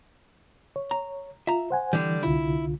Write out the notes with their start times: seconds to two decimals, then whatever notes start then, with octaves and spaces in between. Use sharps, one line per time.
0.76 C#5
0.91 A#5
1.47 F4 E5 A#5
1.70 C5 F#5 G#5
1.93 D3 E3 G3
2.23 C2 D3 E4 F4